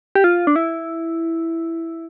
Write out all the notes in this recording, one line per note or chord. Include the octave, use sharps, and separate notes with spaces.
G4
F4
D4
E4